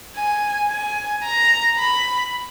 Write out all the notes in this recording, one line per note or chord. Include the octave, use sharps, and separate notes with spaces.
G#5
G#5
A#5
B5